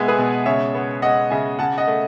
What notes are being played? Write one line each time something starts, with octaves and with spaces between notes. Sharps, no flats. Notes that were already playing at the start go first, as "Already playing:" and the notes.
Already playing: B2 G#3 B3 E5 F#5 G#5
G#4 B4
B2
C#3 C#5 E5
B3
G#3 D#5 F#5
C#3 E5 G#5
C#3 F#5 A5
D#5 F#5
A3